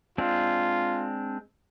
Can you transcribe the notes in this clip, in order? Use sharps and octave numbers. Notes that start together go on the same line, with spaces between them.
G#3 C4 D4 F4